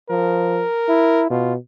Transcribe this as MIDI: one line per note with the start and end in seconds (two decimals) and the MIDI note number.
0.10 0.63 53
0.10 1.25 70
0.89 1.29 64
1.30 1.56 47
1.30 1.53 65